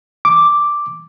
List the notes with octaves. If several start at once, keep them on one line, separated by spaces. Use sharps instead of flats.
D6